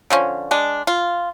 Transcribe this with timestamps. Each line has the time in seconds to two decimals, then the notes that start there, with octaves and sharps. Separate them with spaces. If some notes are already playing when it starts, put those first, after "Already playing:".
0.10 D3 F3 C#4
0.51 G#3 D4
0.87 F4